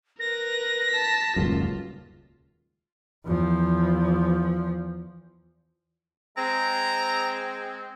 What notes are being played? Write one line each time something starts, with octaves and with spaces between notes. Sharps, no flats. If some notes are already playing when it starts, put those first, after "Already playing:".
A#4 B4 A#6
A5 B6
D#1 C#2 F#2 F4
E2 F3
G#3 C4 A#5